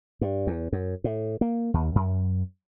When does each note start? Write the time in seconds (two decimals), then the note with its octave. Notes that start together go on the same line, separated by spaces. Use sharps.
0.21 G2
0.47 E2
0.73 F#2
1.04 A2
1.41 A#3
1.74 D#2
1.95 F#2